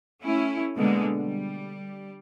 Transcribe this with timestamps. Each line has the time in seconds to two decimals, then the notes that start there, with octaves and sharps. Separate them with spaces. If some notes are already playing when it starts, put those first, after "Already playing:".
0.22 A3 C#4 E4
0.76 B2 D3 G#3 A#3
1.19 G3